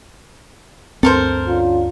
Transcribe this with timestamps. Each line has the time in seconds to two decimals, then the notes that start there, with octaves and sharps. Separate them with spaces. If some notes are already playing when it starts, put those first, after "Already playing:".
1.03 D2 G2 C4 A4 A#4 C5 A#5
1.47 D3 C#4 F4